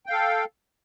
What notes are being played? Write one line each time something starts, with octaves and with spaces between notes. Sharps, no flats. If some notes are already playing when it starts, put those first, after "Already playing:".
A4 F5 G5